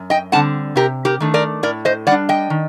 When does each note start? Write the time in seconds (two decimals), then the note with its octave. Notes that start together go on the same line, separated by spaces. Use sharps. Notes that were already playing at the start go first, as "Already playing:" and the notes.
Already playing: F#2
0.10 D#5 G5
0.32 D3 G3 C4 F#5 A5
0.76 C3 G4 A#4
1.05 G4 A#4
1.20 D#3 A3 D4
1.34 A#4 D5
1.63 A2 A#4 D5
1.85 C5 D#5
2.07 G3 D4 D5 F#5
2.29 D#5 G5
2.50 D#3